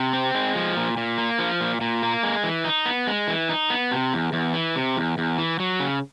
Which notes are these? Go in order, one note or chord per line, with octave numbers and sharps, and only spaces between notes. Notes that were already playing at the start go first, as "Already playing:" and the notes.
Already playing: C3
C4
G#3
F3
A#2
A#2
A#3
F3
A#2
A#2
A#3
G#3
E3
D#4
B3
G#3
E3
D#4
B3
C3
E2
E2
E3
C3
E2
E2
E3
F#3
C#3